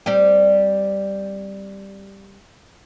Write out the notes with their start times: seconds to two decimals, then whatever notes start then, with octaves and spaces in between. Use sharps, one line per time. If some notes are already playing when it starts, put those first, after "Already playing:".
0.06 G3 C4 G4